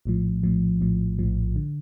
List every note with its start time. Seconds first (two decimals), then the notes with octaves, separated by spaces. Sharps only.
0.05 A#1 A2 F3
0.43 A#1 A2 F3
0.81 A#1 A2 F3
1.19 A#1 A2 F3
1.56 D3